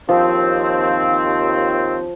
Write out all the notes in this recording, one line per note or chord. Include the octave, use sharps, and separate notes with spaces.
D#2 F3 C4